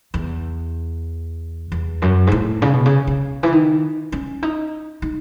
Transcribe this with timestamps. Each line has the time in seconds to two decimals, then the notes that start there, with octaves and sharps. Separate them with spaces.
0.14 E2
1.72 E2
2.02 F#2
2.27 G#2
2.32 A2
2.62 C#3
2.73 B2
2.85 C#3
3.07 C#3
3.43 E3
3.52 D#3
4.12 C#4
4.42 D#4
5.02 D#4